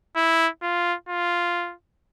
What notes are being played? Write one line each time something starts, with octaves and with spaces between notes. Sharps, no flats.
E4
F4
F4